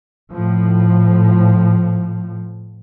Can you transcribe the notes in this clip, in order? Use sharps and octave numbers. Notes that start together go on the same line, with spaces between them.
A2 F3